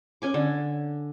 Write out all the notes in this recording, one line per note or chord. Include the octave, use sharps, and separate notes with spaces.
C#4 G#5 D6
D3